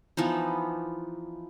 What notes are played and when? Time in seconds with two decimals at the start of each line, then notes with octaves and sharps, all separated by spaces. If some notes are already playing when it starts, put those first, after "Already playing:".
0.17 E3 F3 B3 D#4